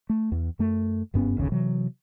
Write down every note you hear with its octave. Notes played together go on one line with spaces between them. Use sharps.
A3
E2
F#2 A3
F#1 G2 B3 C#4
G1 D#2 C#3
C3 E3 F#3